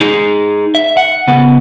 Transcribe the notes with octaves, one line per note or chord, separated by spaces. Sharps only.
D#4 G#4
E5
F#5
C#3 B3